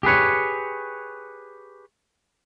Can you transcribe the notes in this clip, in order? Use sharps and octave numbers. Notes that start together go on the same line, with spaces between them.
G4 G#4 B4 C#5